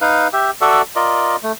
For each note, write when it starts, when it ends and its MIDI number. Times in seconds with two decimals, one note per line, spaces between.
0.01 0.28 63
0.01 0.28 71
0.01 0.28 77
0.33 0.51 67
0.33 0.51 76
0.61 0.82 66
0.61 0.82 69
0.61 0.82 74
0.61 0.82 76
0.96 1.36 65
0.96 1.36 70
0.96 1.36 74
0.96 1.36 75
1.43 1.52 57